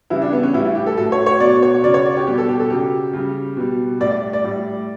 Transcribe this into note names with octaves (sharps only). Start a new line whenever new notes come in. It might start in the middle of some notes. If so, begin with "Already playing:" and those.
C#3 E3 G3 E4
D4
B3
C#4
A2 G3 E4
E4
G4
A4
A2 F#3 A4
C#5
C#5
B2 F#3 D5
C#5
C#3 F#3 D5
C#5
D5
G4
B2 G3 G4
A4
G4
A4
C#3 F#3 G4
C#3 G3
B2 G3
A2 G3 D5
D5
D5
A2 G3